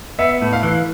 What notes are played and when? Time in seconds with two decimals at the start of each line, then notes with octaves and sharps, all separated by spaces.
0.19 B3 E5
0.42 A2
0.53 F5
0.63 E3